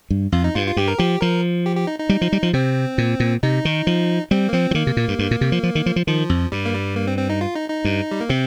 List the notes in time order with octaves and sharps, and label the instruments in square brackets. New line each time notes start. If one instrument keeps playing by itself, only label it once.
[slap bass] G2
[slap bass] F2 [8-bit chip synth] F4
[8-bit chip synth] D#4
[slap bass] G2 [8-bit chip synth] F4
[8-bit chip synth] F4
[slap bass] G2 [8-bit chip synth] G4
[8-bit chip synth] A#4
[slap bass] F3 [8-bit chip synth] G4
[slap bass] F3 [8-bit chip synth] A#4
[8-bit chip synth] G4
G4
D#4
D#4
[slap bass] G3
F3
G3
F3
[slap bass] C3 [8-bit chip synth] C4
[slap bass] A#2
A#2
[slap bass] C3 [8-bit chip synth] D#4
[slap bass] D#3
F3
[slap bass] G3 [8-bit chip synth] C4
[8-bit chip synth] A#3
[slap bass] F3 [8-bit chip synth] C4
[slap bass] F3
[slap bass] D#3 [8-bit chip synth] A#3
[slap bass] C3
A#2
G2
G2
A#2
C3
F3
F3
D#3
F3
F3
[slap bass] D#3 [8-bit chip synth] F3
[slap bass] F2
[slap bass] G2 [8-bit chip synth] G3
[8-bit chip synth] A#3
G3
A#3
C4
C4
D#4
F4
D#4
D#4
[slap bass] G2
[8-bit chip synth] G3
A#3
[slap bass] C3 [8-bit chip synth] C4